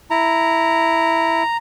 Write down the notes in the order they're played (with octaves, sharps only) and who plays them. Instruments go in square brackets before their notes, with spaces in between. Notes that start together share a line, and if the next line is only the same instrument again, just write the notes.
[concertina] E4 [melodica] A#5